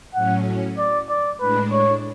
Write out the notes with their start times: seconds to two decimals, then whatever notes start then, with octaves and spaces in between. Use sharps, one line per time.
0.15 A2 F#3 C#4 F#5
0.78 D5
1.09 D5
1.40 A2 G#3 D4 B4
1.72 C#5